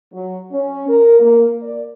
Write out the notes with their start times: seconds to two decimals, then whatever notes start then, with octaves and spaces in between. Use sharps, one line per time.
0.13 F#3
0.52 C#4
0.88 A#4
1.19 A#3
1.62 D5